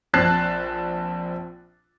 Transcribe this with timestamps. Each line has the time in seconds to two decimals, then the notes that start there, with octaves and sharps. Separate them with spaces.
0.14 A#1 C4 A5 F#6 A6 C7